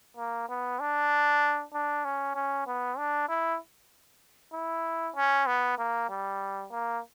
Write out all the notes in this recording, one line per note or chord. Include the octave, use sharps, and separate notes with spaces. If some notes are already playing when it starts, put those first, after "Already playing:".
A#3
B3
D4
D4
C#4
C#4
B3
D4
E4
E4
C#4
B3
A#3
G3
A#3